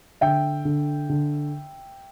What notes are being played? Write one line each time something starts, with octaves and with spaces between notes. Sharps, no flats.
D3 E5 G5
D3
D3